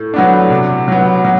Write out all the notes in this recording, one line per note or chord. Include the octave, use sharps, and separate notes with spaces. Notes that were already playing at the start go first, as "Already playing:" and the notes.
Already playing: A2
F#3 B3 D4
C3
F#3 B3
F#3